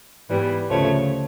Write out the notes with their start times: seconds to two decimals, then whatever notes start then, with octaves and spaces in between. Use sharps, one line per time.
0.29 G#2 E3 G3 B3
0.69 D2 C#3 F3 A3 C#5